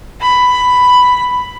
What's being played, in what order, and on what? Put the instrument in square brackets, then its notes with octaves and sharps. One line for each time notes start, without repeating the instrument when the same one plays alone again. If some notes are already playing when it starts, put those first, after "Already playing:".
[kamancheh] B5